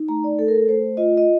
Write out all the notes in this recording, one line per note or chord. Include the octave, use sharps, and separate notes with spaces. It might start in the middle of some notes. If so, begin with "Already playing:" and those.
Already playing: D#4
A3 A#5
D5
A3 A4
A#4
A4
A3 C5
F4 D#5
D#5